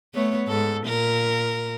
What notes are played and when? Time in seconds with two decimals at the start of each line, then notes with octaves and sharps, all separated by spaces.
0.14 A3 B3 C#5
0.48 G#2 A4
0.86 A#2 A#4